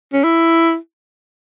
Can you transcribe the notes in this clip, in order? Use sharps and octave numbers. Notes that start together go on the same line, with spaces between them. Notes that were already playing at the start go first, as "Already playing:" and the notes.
C#4
E4